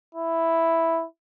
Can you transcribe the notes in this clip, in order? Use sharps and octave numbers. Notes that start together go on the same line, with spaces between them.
E4